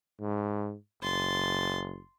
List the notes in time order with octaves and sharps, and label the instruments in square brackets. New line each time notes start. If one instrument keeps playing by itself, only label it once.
[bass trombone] G#2
[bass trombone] F#1 [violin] C6 A6